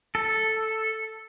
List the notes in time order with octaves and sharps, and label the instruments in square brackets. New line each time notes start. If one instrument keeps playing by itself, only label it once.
[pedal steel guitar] A4